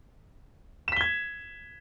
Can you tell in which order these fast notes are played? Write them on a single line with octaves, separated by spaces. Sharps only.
E7 B6 G7 G#6